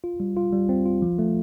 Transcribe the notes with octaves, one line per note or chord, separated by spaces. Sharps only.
F4
G3
F4
G3
C4
F4
F3
A3